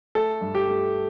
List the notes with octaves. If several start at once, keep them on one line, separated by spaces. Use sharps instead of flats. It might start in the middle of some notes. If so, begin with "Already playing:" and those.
A3 A4
G2
G4
A3